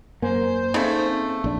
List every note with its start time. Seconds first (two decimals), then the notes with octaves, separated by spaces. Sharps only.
0.22 F#2 A#3 C5 G#5
0.74 C#3 A3 C4 D#4
1.44 A#1 D4